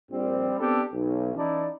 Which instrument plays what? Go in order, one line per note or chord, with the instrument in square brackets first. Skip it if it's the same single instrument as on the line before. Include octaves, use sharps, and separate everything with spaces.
[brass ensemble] A#1 G3 C4
B3 C4 D4 G4 A4
B1
E3 C#4 D#4 E4 D5 A5